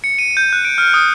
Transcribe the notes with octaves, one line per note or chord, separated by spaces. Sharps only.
C#7
D#7
G6
F#6
D7
F6
D#6